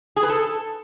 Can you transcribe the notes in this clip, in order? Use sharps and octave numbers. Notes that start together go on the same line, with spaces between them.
G#4
B4
A4